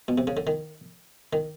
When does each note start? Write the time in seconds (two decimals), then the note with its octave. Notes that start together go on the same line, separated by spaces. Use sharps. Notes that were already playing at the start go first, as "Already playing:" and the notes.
0.08 B2
0.18 C3
0.27 C#3
0.37 D3
0.47 D#3
1.33 D#3